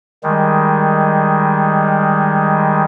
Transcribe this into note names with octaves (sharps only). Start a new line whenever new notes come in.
D#3 G3 G#3